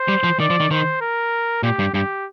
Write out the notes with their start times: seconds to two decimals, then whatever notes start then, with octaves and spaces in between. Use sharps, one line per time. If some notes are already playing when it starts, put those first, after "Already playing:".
Already playing: C5
0.08 G3
0.24 F3
0.40 D#3 D5
0.50 F3
0.60 D#3
0.71 D#3 C5
1.01 A#4
1.63 A#2 G4
1.79 G2
1.94 G2 G4